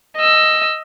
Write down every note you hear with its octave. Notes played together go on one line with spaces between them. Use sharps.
D#5 E6